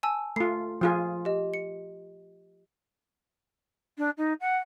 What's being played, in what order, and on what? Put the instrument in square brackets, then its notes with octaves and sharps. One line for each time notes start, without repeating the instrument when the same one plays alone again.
[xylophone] G#5 A5 E6
[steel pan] A3 F4 [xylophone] C7
[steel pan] F3 F4 G#4
[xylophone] G4 D#5
C#7
[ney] D4
D#4
F#5